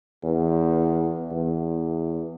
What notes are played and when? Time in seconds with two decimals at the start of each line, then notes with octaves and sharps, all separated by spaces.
0.23 E2
1.31 E2